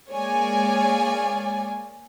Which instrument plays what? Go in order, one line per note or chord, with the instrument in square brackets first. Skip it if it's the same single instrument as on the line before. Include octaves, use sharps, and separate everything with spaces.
[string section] G#3 A#3 G#4 C#5 D5 G#5